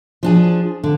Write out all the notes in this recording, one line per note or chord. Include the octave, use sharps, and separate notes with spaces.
F3 D4 G#4
D3